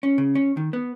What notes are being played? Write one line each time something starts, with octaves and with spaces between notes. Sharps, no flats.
C#4
C#3
C#4
D#3
B3